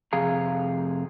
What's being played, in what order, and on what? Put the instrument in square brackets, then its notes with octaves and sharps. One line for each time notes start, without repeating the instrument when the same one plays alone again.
[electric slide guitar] F2 C3 G#4 F5 A#5